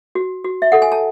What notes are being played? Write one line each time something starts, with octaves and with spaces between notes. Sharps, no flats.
F#4
F#4
E5
A4 F#5
G#5
A5